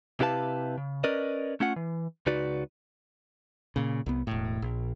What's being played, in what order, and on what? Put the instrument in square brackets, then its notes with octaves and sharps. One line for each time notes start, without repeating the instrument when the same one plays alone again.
[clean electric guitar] C3 E4 G4 B4 F5 A5
C#3
C#4 A#4 B4 D5 D#5
A3 C#4 F4 F#5
E3
C#2 C#3 D#4 F#4 B4 D5
[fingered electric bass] A#2 C#3
C2 B3
E1 A2
A#1